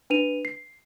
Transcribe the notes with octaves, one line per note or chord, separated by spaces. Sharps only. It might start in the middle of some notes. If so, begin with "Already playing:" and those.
D4 B4 D#7 F7
C7